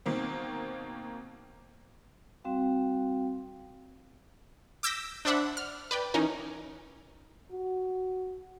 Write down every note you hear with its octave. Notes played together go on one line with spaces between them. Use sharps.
B2 D#3 A#3 C4
G3 C4 F#4 F5 G5
D6 E6 G6 A#6 B6
D4 C5 D5 E5 F#5 B5
F6
B4 D5 G5
E3 C#4 D#4 A#4
F#4